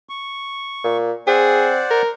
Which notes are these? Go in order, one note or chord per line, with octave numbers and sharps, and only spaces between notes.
C#6
A#2
C4 G#4 C5 D5 F#5
A#4